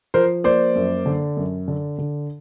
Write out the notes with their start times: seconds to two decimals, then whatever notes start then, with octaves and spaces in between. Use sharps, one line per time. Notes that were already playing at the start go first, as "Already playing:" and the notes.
0.14 F3 A#4 C5
0.44 A#3 C5 D5
0.75 F#2
1.06 D3
1.37 F#2
1.68 D3
1.98 D3